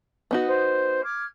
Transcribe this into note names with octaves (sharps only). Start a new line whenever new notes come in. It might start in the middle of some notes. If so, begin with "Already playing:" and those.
B3 D#4 F#4
C5
D6 F6 G#6